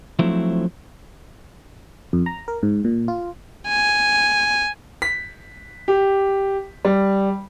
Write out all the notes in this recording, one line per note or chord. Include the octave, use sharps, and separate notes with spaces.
F3 F#3 A3 C4 E4
F2
A#5
A#4
G#2
A#2
F4
G#5
B6
G4
G3